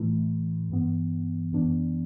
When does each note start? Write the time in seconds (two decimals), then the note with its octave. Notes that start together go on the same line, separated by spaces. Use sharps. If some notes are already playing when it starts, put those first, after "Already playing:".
Already playing: A2 E3 A3 E4
0.70 G2 E3 B3
1.52 F#2 E3 B3 D4